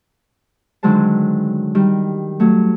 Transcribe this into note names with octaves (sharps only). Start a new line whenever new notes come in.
D3 D#3 F#3 G#3 C5 A5
D#3 G3
F#3 A3